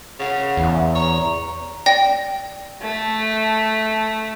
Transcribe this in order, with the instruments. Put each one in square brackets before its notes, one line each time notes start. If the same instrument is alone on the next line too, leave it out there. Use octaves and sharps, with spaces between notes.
[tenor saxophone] C#3 [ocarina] F#5
[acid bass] E2
[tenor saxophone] C#5 [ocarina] A#5
[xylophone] D5 G5 A#6
[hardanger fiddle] A3